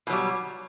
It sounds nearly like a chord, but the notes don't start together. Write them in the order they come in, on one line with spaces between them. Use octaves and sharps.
B2 F#3 G3